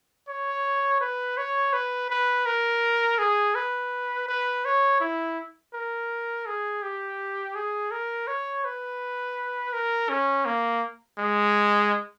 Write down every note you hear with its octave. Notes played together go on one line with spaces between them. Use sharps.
C#5
B4
C#5
B4
B4
A#4
G#4
B4
B4
C#5
E4
A#4
G#4
G4
G#4
A#4
C#5
B4
A#4
C#4
A#3
G#3